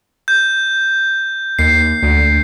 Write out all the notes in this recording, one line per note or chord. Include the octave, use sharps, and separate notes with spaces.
G6
D#2 C7
D2